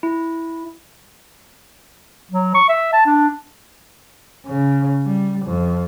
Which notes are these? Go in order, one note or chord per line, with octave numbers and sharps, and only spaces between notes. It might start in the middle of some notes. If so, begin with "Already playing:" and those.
E4
F#3
C#6
E5
A5
D4
C#3
G3
F2